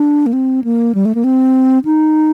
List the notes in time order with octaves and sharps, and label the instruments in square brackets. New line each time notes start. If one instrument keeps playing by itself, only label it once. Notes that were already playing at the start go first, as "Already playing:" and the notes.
Already playing: [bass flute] D4
A#3
C4
A#3
G3
A3
A#3
C4
D#4